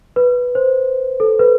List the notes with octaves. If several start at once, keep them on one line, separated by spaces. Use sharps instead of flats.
B4
C5
A4
B4